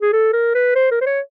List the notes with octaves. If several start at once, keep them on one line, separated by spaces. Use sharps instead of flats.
G#4
A4
A#4
B4
C5
A#4
C5
C#5